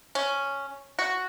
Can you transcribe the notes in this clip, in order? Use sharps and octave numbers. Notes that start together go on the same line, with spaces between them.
C#4
F#4